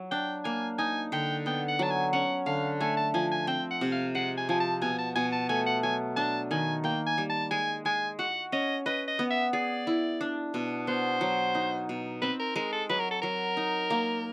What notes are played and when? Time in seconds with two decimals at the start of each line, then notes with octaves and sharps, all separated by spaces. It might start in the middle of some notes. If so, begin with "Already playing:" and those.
Already playing: F#3
0.11 D4 G5
0.44 A#3 G#5
0.78 D#4 G#5
1.12 D3 G5
1.46 B3 G5
1.68 F#5
1.79 F#3 A5
1.91 G#5
2.13 C#4 F#5
2.46 D3 F5
2.80 A3 G#5
2.97 A5
3.14 F3 G#5
3.31 G#5
3.47 C4 G5
3.71 F#5
3.81 C3
3.92 F5
4.15 G#3 F#5
4.37 G#5
4.49 F3 G#5
4.60 A5
4.82 B2 G#5
4.98 A5
5.15 B2 G#5
5.32 A5
5.49 A3 G#5
5.66 F#5
5.83 F#3 G#5
6.16 D4 A5
6.51 D#3 G#5
6.84 A#3 G5
7.06 G#5
7.18 G3
7.29 A5
7.51 G#3 G#5
7.85 G#3 G#5
8.19 F#4 F#5
8.52 C#4 D#5
8.86 B4 D#5
9.08 D#5
9.19 B3
9.30 E5
9.53 G#4 D5
9.87 E4
10.21 D4
10.54 B2
10.87 B3 C5
11.21 F#3
11.55 D#4
11.89 B2
12.22 C4 B4
12.39 A#4
12.56 G#3 A#4
12.72 A4
12.89 F#3 B4
13.00 A#4
13.11 A4
13.22 F#3 A#4
13.57 D#4
13.90 A#3